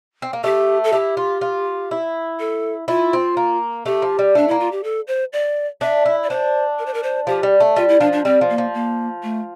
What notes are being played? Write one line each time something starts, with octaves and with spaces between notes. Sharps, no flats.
C4
A#3
A3 G4
A4
E4 G4
F4
F4
E4
A4
E4 F4
C4
A#3
A3 G4
F3
G3
A3 D4
A#3 E4
F4
G4
A4
C5
D5
D4 E5
E4
D5
D4 C5
A#4
C5
A#4
C5
F3 G4
G3
A3
G3 F4
E4
F3 D4
D4
G3 C4
F3
A#3
F3
A#3
A3